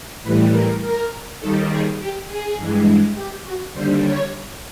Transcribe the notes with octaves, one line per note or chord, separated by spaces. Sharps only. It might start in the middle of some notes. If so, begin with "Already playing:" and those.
A2 E3 G3 B4
A#4
A#4
D#2 D#3 G3 A4
G#4
G4
G#4
G2 E3 G#3
G4
F#4
D#2 D3 G3 C5
C#5